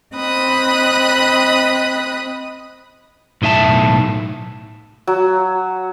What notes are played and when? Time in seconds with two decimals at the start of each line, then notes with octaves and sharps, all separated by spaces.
0.15 C4 D#5 B5 D#6 F#6
3.42 B1 A2 D#4 E5 A5
5.07 F#3